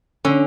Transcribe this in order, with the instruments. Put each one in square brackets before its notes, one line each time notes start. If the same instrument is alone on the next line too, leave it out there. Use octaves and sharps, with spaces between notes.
[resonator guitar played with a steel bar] D3 [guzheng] C#4